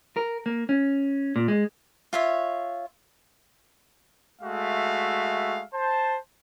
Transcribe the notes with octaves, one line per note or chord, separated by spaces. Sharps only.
A#4
A#3
C#4
A#2
G#3
F4 C#5 E5
G#3 A3 F#4 E5 F5
C5 A5